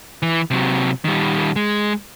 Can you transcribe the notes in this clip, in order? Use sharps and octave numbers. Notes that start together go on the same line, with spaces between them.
E3
C3 F#3
D#3 G3
G#3